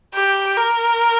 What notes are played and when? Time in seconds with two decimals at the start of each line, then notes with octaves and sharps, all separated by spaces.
0.14 G4
0.57 A#4